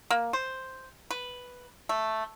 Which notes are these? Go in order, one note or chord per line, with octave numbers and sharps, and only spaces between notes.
A#3
C5
B4
A3